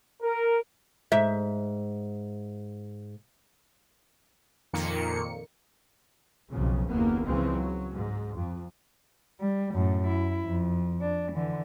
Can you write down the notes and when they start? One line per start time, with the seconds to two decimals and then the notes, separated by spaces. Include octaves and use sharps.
0.22 A#4
1.12 G#2 E5
4.73 F2 A#2 D#3 A#3 C#7
6.48 B1 F2 C#3
6.87 F#1 D#2 A#3 B3
7.25 C#2 C#3 E3 F3 G#3 C4
7.57 F#3
7.93 G#2
8.36 F2
9.41 G3
9.73 F#2 A2
10.07 E4
10.44 F2
11.01 D4
11.33 D3 E3